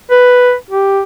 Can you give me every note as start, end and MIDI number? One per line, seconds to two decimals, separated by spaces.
0.11 0.54 71
0.70 1.01 67